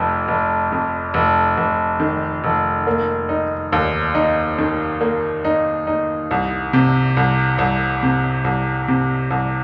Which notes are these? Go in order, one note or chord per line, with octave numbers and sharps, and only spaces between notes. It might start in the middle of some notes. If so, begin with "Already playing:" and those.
Already playing: F1 F2
F1
F2
F1
F1
D#3
F1
A#3
D#4
D#2
D#4
D#3
A#3
D#4
D#4
C2
C3
C2
C2
C3
C2
C3
C2